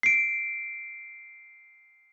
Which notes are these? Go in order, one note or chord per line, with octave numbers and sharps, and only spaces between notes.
C7 D7